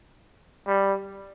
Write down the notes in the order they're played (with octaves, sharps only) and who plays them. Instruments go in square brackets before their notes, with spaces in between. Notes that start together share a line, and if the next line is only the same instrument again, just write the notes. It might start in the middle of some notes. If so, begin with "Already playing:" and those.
[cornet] G3